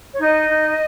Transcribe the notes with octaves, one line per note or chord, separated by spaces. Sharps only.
C#5
D#4 D#5
D#4